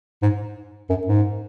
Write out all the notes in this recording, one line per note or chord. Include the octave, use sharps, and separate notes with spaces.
G#2
F#2
G#2